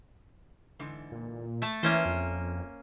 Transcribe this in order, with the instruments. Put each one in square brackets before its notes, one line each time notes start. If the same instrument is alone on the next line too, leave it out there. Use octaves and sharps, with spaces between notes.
[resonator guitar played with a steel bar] G#2 D3 E3
[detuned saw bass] A#2
[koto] A3 A5
[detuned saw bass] E3 [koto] A#3 C#4 C5 [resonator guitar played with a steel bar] A#4 E5
[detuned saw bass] F2